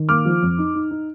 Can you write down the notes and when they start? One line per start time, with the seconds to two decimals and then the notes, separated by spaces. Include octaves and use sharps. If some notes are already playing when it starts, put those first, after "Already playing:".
Already playing: D#3
0.09 A#3 D6 F6
0.26 F3
0.43 F2
0.58 D#4
0.75 D#4
0.91 D#4